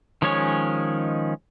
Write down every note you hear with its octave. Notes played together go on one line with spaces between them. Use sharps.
D#3 F3 G#3 C#4 C#5